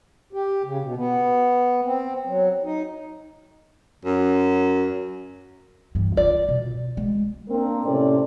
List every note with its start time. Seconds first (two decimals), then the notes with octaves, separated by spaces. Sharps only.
0.33 G4
0.63 C#3
0.82 B2
0.96 B3
1.85 C4
2.26 F#3
2.63 D#4
4.05 F#2
5.95 G2 E3
6.17 F4 D5
6.49 B2
6.97 G#3
7.49 A#3 C4 D4 A#4
7.85 A2 C3 C4 C#4 A4 D5